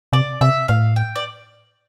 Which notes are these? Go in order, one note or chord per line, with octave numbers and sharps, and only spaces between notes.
C3 D5
C3 E5
A2 F5
G5
D5